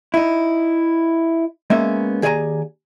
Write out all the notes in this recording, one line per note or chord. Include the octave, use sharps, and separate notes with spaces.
D#4 E4
G#3 A#3 B3 C#4 D#4 E5
D#2 G#4 D5 E5 G#5 A#5